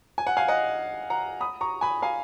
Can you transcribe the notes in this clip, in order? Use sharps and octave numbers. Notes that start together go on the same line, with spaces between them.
G#5
F#5
F5 G#5
D#5 F#5
F#5 A#5
B5 D#6
A#5 C#6
G#5 B5
F5 G#5